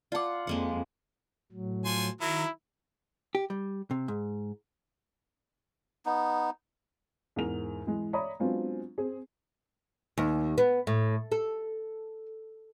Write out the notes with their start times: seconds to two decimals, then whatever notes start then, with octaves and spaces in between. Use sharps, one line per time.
0.12 F4 D5 F#5 A5 D6
0.47 F2 G#3 A#3 F#5
1.52 A2 F#3
1.85 F3 G#5 C6
2.21 D#3 F#3 E4 A#4
3.35 G4
3.50 G3
3.91 C3
4.08 G#2
6.06 B3 D#4
7.36 E2 G#2 A#4 F7
7.87 E3 G#3
8.13 C#5 D5 E5 A#5 B5 D#6
8.40 F#3 G#3 B3 C4 D4 F4
8.98 C4 G#4
10.18 D#2
10.58 B3
10.87 A2
11.32 A4